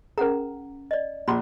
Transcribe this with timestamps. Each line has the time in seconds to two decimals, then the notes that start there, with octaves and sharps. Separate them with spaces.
0.18 C#4 G#4 A#4 F#5 A#5
0.91 D5 D#5
1.28 A#1 B5 C6 D6